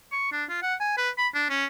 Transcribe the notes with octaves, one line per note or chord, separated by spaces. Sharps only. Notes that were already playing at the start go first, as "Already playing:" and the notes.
C#6
D4
F4
F#5
G#5
B4
B5
D4
C#4